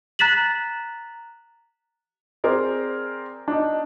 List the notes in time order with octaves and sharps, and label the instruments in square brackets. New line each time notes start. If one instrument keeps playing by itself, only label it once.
[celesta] A#5 F#6 A6 B6 E7 F#7
[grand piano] C4 G#4 A#4 C5 D5
D4 D#4